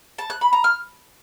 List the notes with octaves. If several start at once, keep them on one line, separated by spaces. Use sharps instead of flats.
A5
F#6
B5
A#5
F6